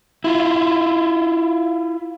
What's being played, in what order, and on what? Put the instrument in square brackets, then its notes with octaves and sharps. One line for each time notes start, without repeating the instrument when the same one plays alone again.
[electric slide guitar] E4 F4